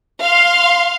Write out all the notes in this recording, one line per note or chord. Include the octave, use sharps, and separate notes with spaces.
F5 C6